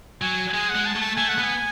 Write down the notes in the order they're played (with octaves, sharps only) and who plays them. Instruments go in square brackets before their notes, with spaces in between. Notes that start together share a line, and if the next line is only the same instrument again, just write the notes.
[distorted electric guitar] F#3 [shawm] G#5
[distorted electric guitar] G#3 [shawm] G#5
[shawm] F#5
[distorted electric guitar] G#3
[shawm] A5
[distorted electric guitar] A3
[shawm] A5
[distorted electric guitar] A3 [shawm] G#5
[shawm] F#5
[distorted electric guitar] B3 [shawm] G#5